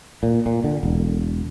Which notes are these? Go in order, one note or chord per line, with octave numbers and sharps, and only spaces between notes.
A#2
A#2
D3
E1